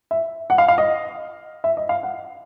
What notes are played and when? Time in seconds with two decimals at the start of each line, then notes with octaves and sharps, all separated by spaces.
0.11 E5
0.50 F#5
0.58 F5
0.68 F5
0.78 D#5
1.64 E5
1.77 D#5
1.89 F5
2.03 F#5